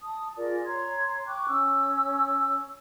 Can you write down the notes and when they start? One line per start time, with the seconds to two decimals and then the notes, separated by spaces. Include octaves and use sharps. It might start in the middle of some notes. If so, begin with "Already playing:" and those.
0.01 A5 D#6
0.37 F4 G#4 A#4 D5
0.66 C#5 A#5 C6 G#6
1.27 G5 C#6 D6 F#6
1.47 C#4 E6